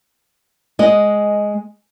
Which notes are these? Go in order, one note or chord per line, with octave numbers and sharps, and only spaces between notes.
G#3 D#5